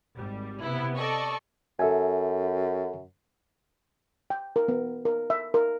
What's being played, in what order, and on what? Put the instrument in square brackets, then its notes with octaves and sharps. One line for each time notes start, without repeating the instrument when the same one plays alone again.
[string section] G#1 G3
C3 B3 E4
A4 D5 D#5 C#6
[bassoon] F#2 [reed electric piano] A4 E5 G#5
[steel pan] G5
A#4
B3
A#4
E5
A#4